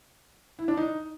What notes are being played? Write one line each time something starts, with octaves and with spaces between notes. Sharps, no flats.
E4
D4
D#4